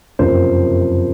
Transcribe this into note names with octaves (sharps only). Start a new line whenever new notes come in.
F#1 F2 C3 F3 A#3 C5